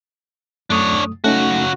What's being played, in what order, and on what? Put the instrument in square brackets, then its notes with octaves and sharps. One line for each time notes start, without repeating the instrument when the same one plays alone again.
[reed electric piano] F#2 A3 D#6 [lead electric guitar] D4 C#5
[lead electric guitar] C#3 F#4 [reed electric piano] A3 C#4 D#4